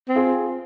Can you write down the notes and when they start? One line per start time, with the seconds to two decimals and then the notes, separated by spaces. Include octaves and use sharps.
0.09 C4
0.15 F4 G#4